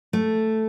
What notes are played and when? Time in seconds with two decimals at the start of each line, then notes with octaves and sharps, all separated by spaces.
0.13 A3